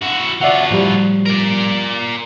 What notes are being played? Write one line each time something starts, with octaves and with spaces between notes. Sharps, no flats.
E4 F#4
F#3 F4 D5 E5 F#5
A2 F3 G3
A#4 D5